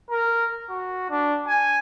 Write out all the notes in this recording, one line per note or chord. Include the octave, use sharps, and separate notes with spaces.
A#4
F#4
D4
G#5